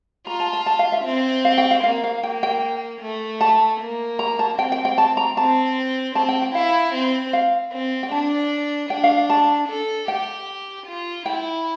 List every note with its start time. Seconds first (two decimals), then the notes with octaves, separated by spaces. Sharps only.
0.27 F4 A#5
0.40 A5
0.53 A5
0.66 A5
0.79 F5
0.92 E5
1.05 C4
1.45 F5
1.58 G5
1.71 F5
1.83 A#3 F5
2.04 F5
2.23 A#3 G5
2.43 G5
3.01 A3
3.41 A5
3.80 A#3
4.19 A#5
4.39 A5
4.58 C4 G5
4.72 G5
4.85 G5
4.98 A5
5.17 A#5
5.37 C4 A5
6.15 C4 A5
6.29 G5
6.42 G5
6.55 E4 F5
6.95 C4
7.33 F5
7.72 C4
8.03 G5
8.11 D4 A5
8.90 D4 G5
9.04 F5
9.30 A5
9.69 A4
10.08 G4 G5
10.86 F4
11.26 E4 G5